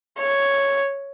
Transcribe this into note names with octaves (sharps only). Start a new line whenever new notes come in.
C#5